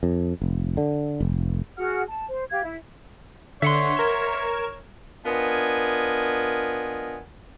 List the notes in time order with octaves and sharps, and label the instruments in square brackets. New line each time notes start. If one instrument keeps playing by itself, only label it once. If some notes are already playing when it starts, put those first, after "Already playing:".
[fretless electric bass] F2
F1
D3
F1
[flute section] F#4 G#4 F#5 F6
A5
C5
G4 F5 G#6
E4
[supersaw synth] D3 [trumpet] C#5 [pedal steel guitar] E5 F#5 C6
[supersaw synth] A#4 G#6 E7
[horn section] B3 D4 F4 A#4 D#5 G#5